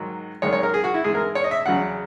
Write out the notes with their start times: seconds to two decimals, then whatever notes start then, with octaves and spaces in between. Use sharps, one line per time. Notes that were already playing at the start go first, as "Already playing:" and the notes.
Already playing: G#2 D#3 F#3
0.42 F#2 D#3 G#3 C#5
0.53 C#5
0.63 A#4
0.74 G#4
0.84 F#4
0.94 E4
1.04 G#2 E3 G#3 G#4
1.15 A#4
1.35 C#5
1.44 D#5
1.51 E5
1.66 E2 C#3 F#3 F#5